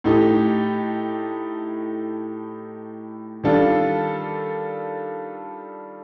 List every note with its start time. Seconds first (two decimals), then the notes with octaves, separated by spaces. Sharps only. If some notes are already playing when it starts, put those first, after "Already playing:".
0.04 A2 A3 D#4 G4
3.44 D#3 G3 D4 F4 A4